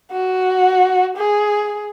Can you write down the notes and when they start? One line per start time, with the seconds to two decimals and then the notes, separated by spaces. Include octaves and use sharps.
0.12 F#4
1.17 G#4